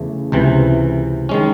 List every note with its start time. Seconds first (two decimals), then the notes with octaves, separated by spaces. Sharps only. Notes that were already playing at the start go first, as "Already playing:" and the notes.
Already playing: E2 C#3 E3 A3
0.32 C#2 C3 E3
1.29 D#3 G#3 C#4